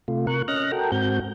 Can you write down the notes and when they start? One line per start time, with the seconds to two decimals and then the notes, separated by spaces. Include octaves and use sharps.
0.08 C3 A3 F4
0.27 C3 A#4 C#6 F#6
0.48 C#4 D#5 F6 F#6 A#6
0.72 F#4 A4 A#4 G5
0.92 G#2 C4 F#4 G6